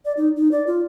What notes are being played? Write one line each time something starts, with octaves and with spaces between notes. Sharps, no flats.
D5
D#4
D#4
D5
F4